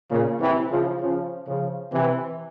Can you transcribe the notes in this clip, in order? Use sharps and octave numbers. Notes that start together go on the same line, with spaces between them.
A#2 C#3
C3 E3
C#3 F3
C#3 F3
C#3 F3
C3 E3